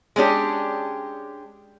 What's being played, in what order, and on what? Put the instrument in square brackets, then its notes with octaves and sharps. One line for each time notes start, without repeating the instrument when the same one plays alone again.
[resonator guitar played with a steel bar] G#3 C#4 D4 G4